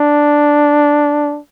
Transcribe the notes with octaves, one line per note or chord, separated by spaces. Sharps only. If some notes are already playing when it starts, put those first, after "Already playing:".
Already playing: D4